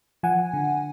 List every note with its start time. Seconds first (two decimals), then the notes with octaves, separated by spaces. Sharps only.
0.23 F3 F#5 G#5
0.53 D3